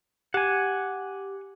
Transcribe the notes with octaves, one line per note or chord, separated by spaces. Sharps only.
G4 F#5 G#5